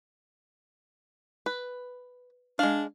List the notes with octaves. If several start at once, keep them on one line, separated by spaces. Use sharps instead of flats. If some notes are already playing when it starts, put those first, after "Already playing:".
B4
G#3 D4 F5